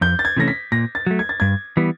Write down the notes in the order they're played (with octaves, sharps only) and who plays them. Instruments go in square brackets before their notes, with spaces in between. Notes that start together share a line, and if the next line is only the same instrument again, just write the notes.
[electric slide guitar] F2 [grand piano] G6
[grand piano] A6
G#6
[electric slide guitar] C3 E3 A3 C#4 [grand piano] A#6
[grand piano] B6
[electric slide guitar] A#2 [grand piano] A#6
[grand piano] A6
[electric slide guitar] F#3 A3
[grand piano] G#6
A6
[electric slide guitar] G2 [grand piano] G#6
[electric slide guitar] E3 G3 B3